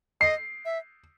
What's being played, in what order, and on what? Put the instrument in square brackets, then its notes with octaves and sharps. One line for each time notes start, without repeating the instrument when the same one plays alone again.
[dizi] D#5 [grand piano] C7
[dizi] E5